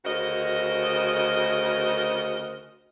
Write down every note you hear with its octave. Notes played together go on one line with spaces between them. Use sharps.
D2 C#3 F#4 A#4 C5 D#5